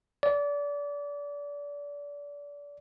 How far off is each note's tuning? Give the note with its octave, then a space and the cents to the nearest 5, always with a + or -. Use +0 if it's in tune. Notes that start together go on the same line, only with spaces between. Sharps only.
D5 -30